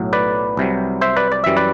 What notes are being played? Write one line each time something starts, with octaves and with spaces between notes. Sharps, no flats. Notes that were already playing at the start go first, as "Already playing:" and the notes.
Already playing: B1 A2 F#3
B4 D5
C2 C3 F#3
C5 E5
B4 D5
D5
F#2 E3 G3 E5
B4 D5